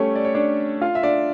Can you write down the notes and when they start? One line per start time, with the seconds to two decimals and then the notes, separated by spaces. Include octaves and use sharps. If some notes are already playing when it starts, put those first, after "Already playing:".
Already playing: G3 A3 C#4 G4 A4 C#5
0.16 D5
0.25 C#5
0.35 D4 D5
0.81 F4 F5
0.95 E5
1.03 D4 D5